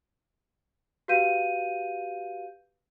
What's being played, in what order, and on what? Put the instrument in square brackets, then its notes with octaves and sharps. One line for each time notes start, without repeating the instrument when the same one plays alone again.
[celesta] F#4 G4 B4 F5 G6 D#7